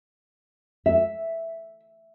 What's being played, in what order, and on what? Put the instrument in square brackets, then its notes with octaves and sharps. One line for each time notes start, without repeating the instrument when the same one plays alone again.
[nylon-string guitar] E5